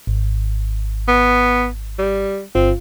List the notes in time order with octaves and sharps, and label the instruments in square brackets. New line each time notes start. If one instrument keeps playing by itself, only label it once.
[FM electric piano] G#1
[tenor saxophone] B3
G3
[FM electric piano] G1 F4 [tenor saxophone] C4